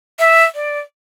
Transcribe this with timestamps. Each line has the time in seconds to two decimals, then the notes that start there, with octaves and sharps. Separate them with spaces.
0.19 E5
0.55 D5